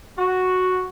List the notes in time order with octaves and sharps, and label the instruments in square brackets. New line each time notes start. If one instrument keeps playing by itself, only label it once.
[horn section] F#4